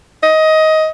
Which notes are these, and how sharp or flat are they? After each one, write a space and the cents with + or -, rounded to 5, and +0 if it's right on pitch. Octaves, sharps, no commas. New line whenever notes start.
D#5 +15